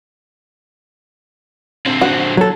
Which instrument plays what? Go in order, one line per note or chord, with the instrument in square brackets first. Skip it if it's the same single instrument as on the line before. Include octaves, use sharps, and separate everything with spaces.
[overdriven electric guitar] D3 C4
[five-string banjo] F#4
[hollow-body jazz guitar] F#3 A4